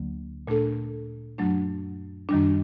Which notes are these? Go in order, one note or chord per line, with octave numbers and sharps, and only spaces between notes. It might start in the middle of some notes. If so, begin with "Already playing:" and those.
Already playing: D2 D3 F#3 A#3
A#2 A3 D4 A4
F#2 F#3 A3 D4
F#2 D#3 G3 D4